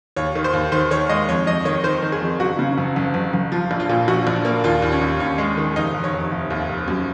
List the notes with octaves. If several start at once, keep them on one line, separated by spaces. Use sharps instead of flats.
D#2 C#5
D#3
C5
D#2
D#3 C5
D#3 C#5
G#3 D#5
F2 C#5
F2 D#5
D#3 C#5
D#3 C5
D#3
G#4
F2
F#1 F#4
C#3
F#1
F#1
F#1
F#1
F3
A#1
F4
A#2
A#1 F#4
A#1
A#3
D#2 F4
D#2
C#4
D#2
D#2 C#4
G#3
D#3
F1 D#4
F1
C#5
F1
F1
D#2
F1
F#2